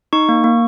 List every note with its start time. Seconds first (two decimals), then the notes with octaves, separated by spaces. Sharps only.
0.13 D#4 C#6
0.29 A#3
0.44 A#3